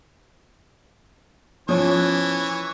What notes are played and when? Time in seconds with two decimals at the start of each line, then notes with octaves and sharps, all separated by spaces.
1.69 E3 F3 C#4 C#5